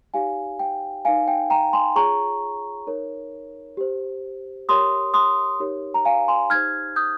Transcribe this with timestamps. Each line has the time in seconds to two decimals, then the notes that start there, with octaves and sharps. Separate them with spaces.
0.14 D#4 G4 C#5 F5 G#5
0.59 G5
1.05 D#4 A#4 C#5 F5 G#5
1.28 G5
1.50 G5 A#5
1.73 G#5 C6
1.96 F4 G#4 C#5 A#5 C#6
2.87 D#4 A#4 C#5
3.77 G4 C5
4.69 G4 A#4 C#5 C6 D#6
5.14 C6 D#6
5.60 D#4 G4 A#4 C#5
5.94 A#5
6.05 F5 G#5
6.28 G#5 C6
6.50 D#4 G4 C5 F6 G#6
6.96 D#6 G6